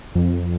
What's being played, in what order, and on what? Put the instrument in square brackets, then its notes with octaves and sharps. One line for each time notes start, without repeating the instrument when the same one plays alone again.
[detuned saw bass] F2